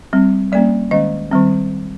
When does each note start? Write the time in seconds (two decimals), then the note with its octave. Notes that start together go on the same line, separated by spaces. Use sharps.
0.13 G3 C4
0.52 G3 A#3 C#4 D5
0.91 D#3 G#3 C#4 D#5
1.31 D#3 G3 C4